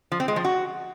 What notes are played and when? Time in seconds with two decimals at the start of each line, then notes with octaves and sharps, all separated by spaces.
0.12 F3
0.20 C4
0.28 G#3
0.36 F3
0.45 F#4